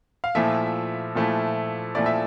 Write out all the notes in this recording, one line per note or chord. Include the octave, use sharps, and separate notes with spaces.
F5
A#2 F3 A3 E4 E5
A#2 F3 A3 E4
A#2 F3 A3 E4 D5
E5